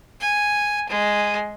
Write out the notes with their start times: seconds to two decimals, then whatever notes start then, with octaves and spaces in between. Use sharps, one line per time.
0.20 G#5
0.89 G#3